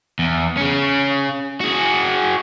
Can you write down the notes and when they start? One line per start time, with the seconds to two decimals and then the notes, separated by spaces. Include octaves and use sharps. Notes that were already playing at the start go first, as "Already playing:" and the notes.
0.19 E2
0.57 C#3 C#4
1.61 F#4 G#4